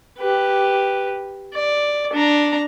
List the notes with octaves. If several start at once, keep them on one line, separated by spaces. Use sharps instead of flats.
G4 B4
D5
D4 A#5